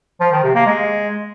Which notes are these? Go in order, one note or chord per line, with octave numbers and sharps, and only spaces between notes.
F3
D#3
C3
A#3
G#3